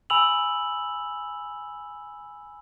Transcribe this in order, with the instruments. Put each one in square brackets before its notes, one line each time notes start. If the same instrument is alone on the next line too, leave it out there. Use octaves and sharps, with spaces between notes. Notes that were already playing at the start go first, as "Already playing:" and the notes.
[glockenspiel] G#5 B5 E6 F7 F#7